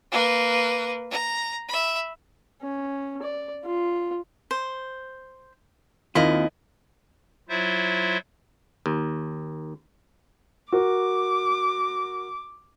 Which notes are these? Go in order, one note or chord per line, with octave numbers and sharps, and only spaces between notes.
A#3 B4
A#5
E5 B5
C#4
D5
F4
C5
D#2 A#3 C4 E4 F4 D#5
F#3 E4 F4 C5 E5
D#2
F#4 A#4 D6